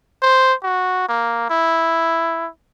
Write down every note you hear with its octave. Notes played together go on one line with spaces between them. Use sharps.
C5
F#4
A#3
E4